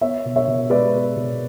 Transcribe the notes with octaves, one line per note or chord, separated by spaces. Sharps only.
B3 C#5 E5
B2
C#5 E5
B2
G#3 B4 D5
B3
B2